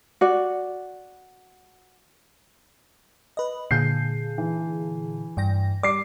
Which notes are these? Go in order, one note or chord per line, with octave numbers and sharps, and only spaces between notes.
F#4 D5
B4 D#5
A#2 D3 G#4 G6 C7
E3
G2 G5 A#6
G3 D5 D6 C7